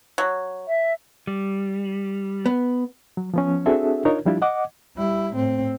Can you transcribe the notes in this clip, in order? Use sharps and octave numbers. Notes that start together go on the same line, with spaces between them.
F#3
E5
G3
B3
F#3
F3 B3 C#4
C4 D4 F#4 G#4 A4 E5
D4 D#4 F4 A#4 C#5
F3 G3 D4 E4 F4 G4
D#5 F#5 D6
G3 E4
A2 C4